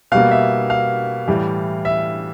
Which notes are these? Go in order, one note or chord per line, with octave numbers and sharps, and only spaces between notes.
B2 G3 A#3 F5
E5
F5
A2 E3 G3
E5